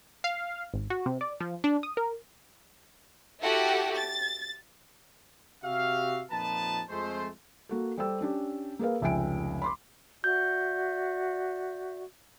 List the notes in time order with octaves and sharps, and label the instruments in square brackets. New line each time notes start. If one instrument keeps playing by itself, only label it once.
[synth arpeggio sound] F5
G#1
F#4
C3
D5
F3
D4
D#6
A#4
[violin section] E4 F#4 G4 A4 F#5
A6
[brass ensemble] C3 F#4 G4 E5 F5
F2 A#2 F3 D#4 B4 A5
F2 G#3 A3 C5
[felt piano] A#3 F#4 A4
G3 G4 A4 C5 G5 E6
C#4 D4 G4
A#3 G#4 A#4 B4 F5
F1 C#2 E5 G5 G#5 D7
B5 C6 D6
[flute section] F#4 D5 E5 [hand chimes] G6